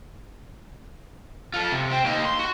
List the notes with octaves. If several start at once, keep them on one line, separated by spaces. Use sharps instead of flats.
F4 A4
C3
C4
A#3 D#4
C6
F#4